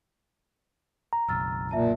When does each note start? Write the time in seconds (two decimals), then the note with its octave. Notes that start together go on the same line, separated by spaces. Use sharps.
1.13 A#5
1.28 F#1 B1 E6 F6 A6
1.71 A#2 E5 A5